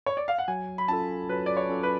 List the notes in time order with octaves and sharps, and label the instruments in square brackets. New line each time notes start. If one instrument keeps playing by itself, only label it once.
[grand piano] C#5
D5
F5
F#5
[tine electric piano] F#3 [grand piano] G#5
[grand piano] B5
[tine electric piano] C#4 F4 A4 [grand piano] A5
[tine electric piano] F#3 [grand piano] B4
[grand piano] D5
C#5
[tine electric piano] C#4 F4 A4
[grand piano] B4